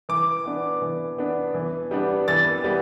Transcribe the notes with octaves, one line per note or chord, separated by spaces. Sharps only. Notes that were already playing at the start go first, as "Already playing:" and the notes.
E3 D6
B3 D4
E3
B3 D4
E3
G3 B3 D4
E3 A6
G3 B3